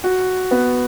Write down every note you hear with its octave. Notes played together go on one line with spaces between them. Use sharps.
F#4
B3